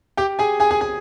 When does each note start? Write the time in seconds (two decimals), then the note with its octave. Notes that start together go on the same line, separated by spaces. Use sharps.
0.17 G4 G5
0.39 G#4 G#5
0.60 G#4 G#5
0.71 G#4 G#5
0.81 G#4 G#5